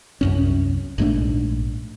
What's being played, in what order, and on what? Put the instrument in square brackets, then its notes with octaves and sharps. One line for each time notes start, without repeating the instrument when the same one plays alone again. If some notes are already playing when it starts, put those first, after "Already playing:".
[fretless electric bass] C2 F#2 C#4
A#1 G#2 A3 D4